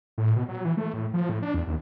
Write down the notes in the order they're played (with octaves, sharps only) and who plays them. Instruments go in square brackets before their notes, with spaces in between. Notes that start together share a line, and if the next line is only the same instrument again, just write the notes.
[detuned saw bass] A2
B2
F#3
E3
A3
A2
F3
A2
D4
E2
D#2